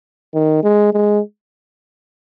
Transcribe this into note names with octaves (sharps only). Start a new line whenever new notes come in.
D#3
G#3
G#3